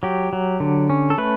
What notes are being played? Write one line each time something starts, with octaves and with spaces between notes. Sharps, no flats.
F#3 G4
F#3
D3
C#4
A4
A3 B4